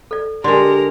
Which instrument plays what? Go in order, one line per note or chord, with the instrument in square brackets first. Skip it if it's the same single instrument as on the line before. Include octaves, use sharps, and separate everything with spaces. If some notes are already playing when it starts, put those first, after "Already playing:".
[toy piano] A4 D5
[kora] D3 G#3 [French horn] G4 [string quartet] A#4 [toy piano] C6